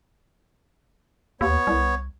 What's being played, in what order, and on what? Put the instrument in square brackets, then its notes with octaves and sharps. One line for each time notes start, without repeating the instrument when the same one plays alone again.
[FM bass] D#2 [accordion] B3 C#5
[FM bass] C2